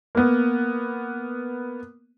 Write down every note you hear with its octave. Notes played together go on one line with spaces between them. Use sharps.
A#3 B3